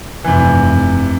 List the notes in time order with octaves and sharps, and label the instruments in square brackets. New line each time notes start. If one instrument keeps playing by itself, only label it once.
[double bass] F1 G2 [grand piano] C3 E3